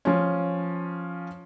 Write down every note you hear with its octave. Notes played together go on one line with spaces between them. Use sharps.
F3 C#4